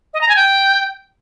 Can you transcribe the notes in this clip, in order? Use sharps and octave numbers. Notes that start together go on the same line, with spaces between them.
D#5
A#5
G#5
G5